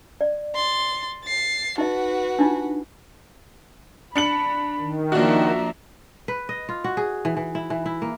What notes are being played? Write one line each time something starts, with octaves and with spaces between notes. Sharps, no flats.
D5
C6 A6
A6 C7
D#4 F#4 B4 D#5
D4 D#4 F4
D4 B5 C#7 F#7
D#3
F3 A#3 D4 F#4 E5 A#5
B4
D#5
F4
F#4
G#4
E3
E3
E4
E3
E4
A#3